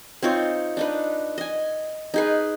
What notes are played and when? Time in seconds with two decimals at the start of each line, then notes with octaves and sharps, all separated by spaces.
0.22 C4 D#4 F4 C#5
0.77 D4 D#4 B4
1.38 D#5 G#5
2.14 D#4 G#4 B4